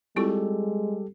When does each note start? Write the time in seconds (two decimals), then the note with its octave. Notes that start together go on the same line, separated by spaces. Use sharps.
0.16 G3 G#3 C4 E4 F4 G4 A4